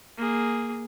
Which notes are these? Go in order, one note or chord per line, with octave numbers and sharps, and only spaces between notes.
A#3 G#4